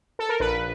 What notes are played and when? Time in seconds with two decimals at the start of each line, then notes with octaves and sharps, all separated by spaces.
0.19 A4
0.29 A#4
0.40 A#1 B4